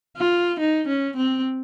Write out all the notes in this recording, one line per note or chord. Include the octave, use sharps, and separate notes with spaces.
F4
D#4
C#4
C4